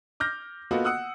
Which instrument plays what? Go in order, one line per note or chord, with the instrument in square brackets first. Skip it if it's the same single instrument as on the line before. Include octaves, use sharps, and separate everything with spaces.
[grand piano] D6 F6 G6 A#6
A#3 B3 F4 F#4 A4 D#5
F#5 D#6 E6 F#6